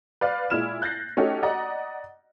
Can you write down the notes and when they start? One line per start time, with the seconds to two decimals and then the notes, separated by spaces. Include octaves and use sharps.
0.21 B4 D5 F5
0.50 A#2 G#3 E4 F6 E7
0.82 F#6 G6 A6 A#6 C7
1.17 A3 C#4 D#4 F#4 G4
1.43 D5 D#5 F#5 A#5